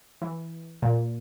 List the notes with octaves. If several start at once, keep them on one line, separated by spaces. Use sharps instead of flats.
E3
A#2